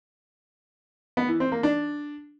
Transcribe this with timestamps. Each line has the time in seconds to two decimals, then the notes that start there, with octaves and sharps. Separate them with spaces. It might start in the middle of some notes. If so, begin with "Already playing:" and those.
1.17 B3
1.29 E3
1.40 C4
1.52 A#3
1.63 D4